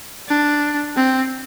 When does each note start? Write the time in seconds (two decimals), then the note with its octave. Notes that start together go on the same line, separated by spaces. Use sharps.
0.28 D4
0.96 C4